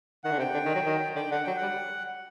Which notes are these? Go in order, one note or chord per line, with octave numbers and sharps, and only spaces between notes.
D#3 F#5
D3
C3 G5
D3
D#3
F#3
D#3
D3 G5
D3 F#5
F#3 G5
F#5
G3